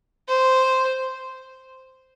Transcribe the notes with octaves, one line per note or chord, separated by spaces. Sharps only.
C5